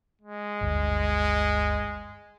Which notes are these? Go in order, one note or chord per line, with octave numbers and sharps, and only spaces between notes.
G#3
G1 D2